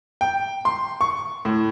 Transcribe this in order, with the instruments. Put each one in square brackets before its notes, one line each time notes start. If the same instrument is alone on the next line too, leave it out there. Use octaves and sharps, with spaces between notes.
[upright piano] G5
C6
C#6
A2